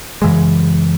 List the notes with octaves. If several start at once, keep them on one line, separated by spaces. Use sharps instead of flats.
F#2 C#3 E3 G#3